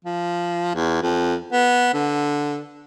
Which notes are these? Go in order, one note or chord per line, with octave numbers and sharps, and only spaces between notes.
F3
E2
F2
B3
D3